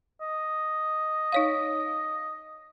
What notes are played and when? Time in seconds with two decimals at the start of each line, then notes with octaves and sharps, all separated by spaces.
0.21 D#5
1.32 D#4 C#5 F5